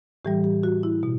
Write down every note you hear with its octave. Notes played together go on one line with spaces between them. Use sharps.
A2 E3 G3 G4
G4
F#4
E4
B2